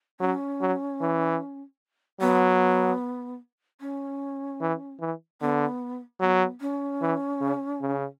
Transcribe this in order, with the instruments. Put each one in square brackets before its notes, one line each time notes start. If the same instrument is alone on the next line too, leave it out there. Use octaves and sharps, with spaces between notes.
[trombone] F#3 [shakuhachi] C#4
[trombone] F#3
E3
[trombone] F#3 [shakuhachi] B3
[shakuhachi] C#4
[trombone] E3
E3
[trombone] D3 [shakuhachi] B3
[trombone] F#3 [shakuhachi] B3
[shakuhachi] C#4
[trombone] E3
C#3
C#3